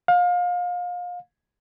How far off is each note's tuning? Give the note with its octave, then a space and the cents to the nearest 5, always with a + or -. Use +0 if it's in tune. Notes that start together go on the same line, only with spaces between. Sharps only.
F5 +30